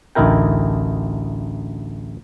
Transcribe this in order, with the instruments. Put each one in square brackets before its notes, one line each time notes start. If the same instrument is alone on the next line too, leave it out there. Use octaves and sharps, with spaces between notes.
[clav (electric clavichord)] A1 D2 D#4 E4 A#4 G5